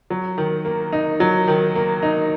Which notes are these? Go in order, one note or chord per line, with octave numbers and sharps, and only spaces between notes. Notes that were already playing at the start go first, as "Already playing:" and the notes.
F#3
D#3
A#3
D#4
F#3
D#3
A#3
D#4